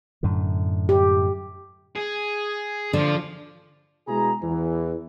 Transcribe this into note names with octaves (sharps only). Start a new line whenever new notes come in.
F#2 A2 D3
G4
G#4
D3 F3 F4
B2 G#3 E4 G#4 A#5
E2 E3